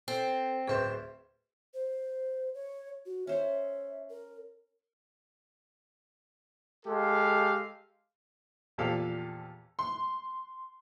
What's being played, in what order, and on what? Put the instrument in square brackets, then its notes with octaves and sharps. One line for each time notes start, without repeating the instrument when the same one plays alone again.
[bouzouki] C4 [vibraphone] A4 C5
[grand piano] D1 C5 C6 [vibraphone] G#4 B4 E5
[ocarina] C5
C#5
F#4
[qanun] C#4 C5 [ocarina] E5
[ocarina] A#4
[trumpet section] G#3 G4 A4 F5
[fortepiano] E2 A#2 F3 G4 A4 F5
[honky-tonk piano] C6